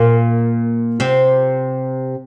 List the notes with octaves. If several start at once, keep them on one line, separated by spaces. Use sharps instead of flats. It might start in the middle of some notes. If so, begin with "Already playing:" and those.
Already playing: A#2 A#3
C3 C4